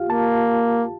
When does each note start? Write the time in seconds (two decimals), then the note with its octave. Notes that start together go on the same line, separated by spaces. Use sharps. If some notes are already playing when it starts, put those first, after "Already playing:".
Already playing: F4 G4 F5
0.09 A#3 A5